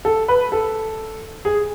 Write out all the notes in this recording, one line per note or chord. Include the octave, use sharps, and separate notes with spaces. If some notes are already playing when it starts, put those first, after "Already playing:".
A4
B4
A4
G#4